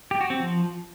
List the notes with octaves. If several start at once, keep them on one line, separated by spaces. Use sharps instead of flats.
G4
F#4
C4
F3